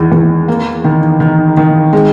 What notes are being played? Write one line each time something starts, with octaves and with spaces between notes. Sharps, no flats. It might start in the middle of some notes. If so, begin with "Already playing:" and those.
Already playing: E2 D#3 G#3
E2
A#3
D#3
D#3
D#3
G#3